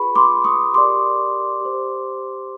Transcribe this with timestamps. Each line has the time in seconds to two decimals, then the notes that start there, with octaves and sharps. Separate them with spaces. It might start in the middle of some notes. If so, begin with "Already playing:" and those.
Already playing: F4 G#4 B4 B5 C#6
0.15 C6 D6
0.44 C#6 D#6
0.74 G4 A#4 D5 C6 D6
1.61 G4 C5